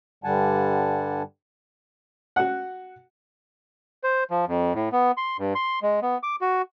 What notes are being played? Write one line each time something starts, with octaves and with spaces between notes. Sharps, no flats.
G2 D3 G3 F#5 G#5 A5
F#4 F#5
C5
F3
F2
A2
B3
C6
G2
C6
G#3
B3
D6
F#4